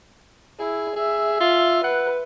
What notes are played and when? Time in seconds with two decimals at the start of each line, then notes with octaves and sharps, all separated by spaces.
0.59 E4 G#4
0.96 G#4 E5
1.40 F4
1.84 B4 F#5